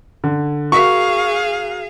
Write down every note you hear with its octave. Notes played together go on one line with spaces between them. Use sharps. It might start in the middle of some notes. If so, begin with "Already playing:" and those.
D3
F#4 G#4 A#4 F5 C#6